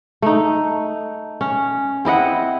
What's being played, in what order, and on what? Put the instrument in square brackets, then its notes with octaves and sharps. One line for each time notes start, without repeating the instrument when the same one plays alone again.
[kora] A3 D#4
C#4
C4 E4 D#5 F#5